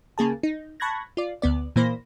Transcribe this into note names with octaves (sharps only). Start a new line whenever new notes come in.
C#3 A#3 G#4 A5
D#4
A5 B5 C#6 F#6 G#6 A#6
F4 D5
D2 B3 D5
A#2 E3 A#3 C5 B5 A#6